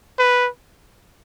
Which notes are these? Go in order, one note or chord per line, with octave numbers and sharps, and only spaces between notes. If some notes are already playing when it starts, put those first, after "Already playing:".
B4